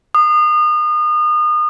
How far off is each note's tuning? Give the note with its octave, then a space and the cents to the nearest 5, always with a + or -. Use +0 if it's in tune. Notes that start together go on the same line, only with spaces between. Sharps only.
D#6 -35